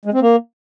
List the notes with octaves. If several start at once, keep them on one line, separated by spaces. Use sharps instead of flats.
G#3
C4
A#3